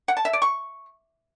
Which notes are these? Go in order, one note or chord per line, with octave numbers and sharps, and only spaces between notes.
F#5
A5
E5
D5
C#6